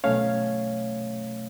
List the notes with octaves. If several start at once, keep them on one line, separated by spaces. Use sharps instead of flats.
B2 F#3 A3 C#4 C#5 F5